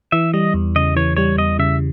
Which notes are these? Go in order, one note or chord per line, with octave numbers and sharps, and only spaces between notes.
E3 E5
G3 D#5
E2
C#3 D#5
E3 C#5
G3 C#5
E2 D#5
C#3 E5